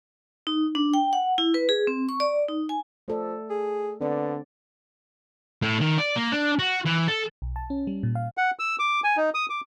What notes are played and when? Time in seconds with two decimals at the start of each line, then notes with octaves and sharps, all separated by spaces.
0.47 D#4
0.75 D4
0.94 G5
1.13 F#5
1.38 E4
1.54 B4
1.69 G#4
1.87 C4
2.09 C#6
2.20 D5
2.48 D#4
2.69 G#5
3.08 F3 A3 A4 D5
3.50 G#4
4.01 D3 B3 C4 D5
5.62 A2
5.81 D#3
5.98 D5
6.16 A#3
6.32 D4
6.59 F#4
6.85 E3
7.08 A4
7.42 B1
7.56 A5
7.70 C#4
7.87 G3
8.03 A#2
8.15 F5
8.37 F#5
8.59 E6
8.79 D6
9.04 G#5
9.17 D#4
9.34 D#6
9.50 D6